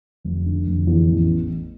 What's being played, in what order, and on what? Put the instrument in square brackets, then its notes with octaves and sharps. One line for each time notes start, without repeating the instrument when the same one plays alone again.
[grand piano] F1
D3
F1
E2
A1